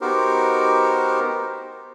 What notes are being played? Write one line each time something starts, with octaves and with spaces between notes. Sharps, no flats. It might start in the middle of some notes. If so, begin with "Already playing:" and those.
B3 D#4 F#4 G4 A#4 C5